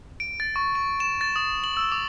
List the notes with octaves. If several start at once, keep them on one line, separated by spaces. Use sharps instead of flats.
D7
A6
C#6
C#6
E7
A6
D#6
F#7
E6
D6